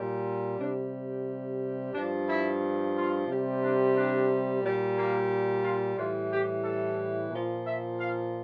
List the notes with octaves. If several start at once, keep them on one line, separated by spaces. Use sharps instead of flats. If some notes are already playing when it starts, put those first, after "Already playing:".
Already playing: A#2 G3
C3 G3 D4
G2 F3 D4
E4
F4
C3 G3
D4
D4
A#2 G3
A#3
F4
A2 E3 G3 F4
G4
A4
A#2 F3
E5
F5